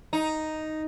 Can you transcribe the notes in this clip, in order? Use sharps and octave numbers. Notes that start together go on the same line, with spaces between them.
D#4